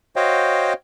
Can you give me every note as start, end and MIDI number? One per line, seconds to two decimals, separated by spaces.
0.16 0.73 66
0.16 0.73 72
0.16 0.73 73
0.16 0.73 75
0.16 0.73 77
0.16 0.73 79